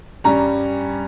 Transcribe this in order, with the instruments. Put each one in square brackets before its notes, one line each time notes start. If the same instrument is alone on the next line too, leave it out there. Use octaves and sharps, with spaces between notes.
[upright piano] G2 G3 C#4 A#5